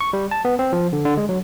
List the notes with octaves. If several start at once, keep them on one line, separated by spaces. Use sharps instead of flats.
C#6
G3
A5
B3
C4
F3
D3
D3
G#3
F#3